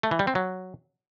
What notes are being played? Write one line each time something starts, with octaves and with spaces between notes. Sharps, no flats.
A3
E3
G3
C4
F#3